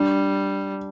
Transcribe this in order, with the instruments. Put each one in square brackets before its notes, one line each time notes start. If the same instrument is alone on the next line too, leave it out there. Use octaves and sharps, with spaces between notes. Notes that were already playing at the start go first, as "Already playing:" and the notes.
Already playing: [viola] G3 [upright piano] D4